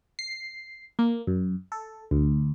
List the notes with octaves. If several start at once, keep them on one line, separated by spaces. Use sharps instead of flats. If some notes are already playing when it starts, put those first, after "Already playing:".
C7
A#3
F#2
A4
D2